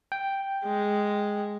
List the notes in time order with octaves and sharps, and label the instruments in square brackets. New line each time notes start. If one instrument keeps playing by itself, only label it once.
[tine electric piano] G5
[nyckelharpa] G#3